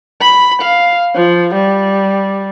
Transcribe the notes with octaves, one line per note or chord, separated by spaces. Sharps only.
B5
F5
F3
G3